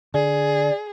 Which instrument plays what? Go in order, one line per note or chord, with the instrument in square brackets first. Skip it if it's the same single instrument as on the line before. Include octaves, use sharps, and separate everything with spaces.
[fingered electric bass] D3 [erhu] G#4 [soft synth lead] D5